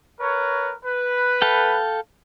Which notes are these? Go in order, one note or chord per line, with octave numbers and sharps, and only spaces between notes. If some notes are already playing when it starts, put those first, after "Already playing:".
A#4 B4 C#5
B4
A4 F5 G5